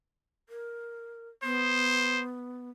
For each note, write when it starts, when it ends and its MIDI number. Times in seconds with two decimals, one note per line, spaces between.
0.49 1.29 70
1.43 2.70 59
1.43 2.22 72